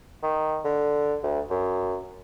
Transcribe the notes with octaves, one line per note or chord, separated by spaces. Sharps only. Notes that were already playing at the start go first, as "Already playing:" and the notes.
D#3
D3
D2
F#2